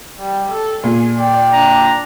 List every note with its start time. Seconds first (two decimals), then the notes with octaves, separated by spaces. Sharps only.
0.20 G3
0.52 A4
0.84 A#2 G#4
1.19 D5 G5
1.52 D4 A#5